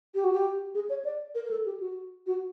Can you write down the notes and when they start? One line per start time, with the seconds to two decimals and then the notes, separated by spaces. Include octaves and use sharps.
0.15 G4
0.24 F#4
0.33 G4
0.75 G#4
0.90 C#5
1.05 D5
1.35 A#4
1.45 A#4
1.51 A4
1.66 G4
1.80 F#4
2.27 F#4